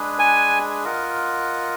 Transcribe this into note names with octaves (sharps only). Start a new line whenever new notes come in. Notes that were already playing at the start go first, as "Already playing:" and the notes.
Already playing: G#3 D4 G#4 B4
G#5
F4 A#4 D#5 F#5